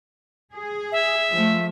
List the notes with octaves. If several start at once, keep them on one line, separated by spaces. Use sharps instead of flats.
G#4
E5
F3 A3